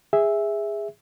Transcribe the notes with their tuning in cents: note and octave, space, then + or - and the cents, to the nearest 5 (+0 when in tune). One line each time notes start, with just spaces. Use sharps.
G#4 -15 E5 -5